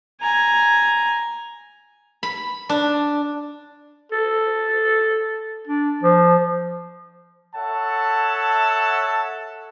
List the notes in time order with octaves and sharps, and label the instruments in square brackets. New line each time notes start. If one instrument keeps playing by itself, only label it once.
[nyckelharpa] G#5 A#5
[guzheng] B5
D4
[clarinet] A4
D4
F3
[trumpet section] A4 C#5 E5 F#5 A5